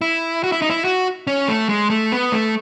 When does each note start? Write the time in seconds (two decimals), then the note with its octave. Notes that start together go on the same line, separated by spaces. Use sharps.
0.01 E4
0.44 F#4
0.52 E4
0.62 D#4
0.70 E4
0.85 F#4
1.27 C#4
1.48 A3
1.69 G#3
1.90 A3
2.12 B3
2.32 A3